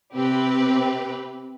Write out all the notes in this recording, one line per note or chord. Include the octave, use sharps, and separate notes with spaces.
C3 C4 G4 B4